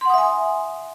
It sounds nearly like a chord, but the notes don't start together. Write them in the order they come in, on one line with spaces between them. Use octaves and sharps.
C6 F#5 D#6 E5 G#5